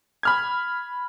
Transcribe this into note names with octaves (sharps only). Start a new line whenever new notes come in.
B5 F6 G#6